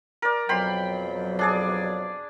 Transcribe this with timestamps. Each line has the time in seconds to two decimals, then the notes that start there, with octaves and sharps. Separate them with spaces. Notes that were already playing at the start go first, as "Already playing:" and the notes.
0.22 A#4 D5
0.49 F2 B2 F#3 G5 B5 C6
1.39 D4 G#4 D5